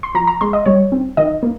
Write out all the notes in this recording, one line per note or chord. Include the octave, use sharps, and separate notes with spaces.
C6
F3 A#5
A#5
G#3 C6
D#5
G3 C#5
C4
D#3 D#5
A#3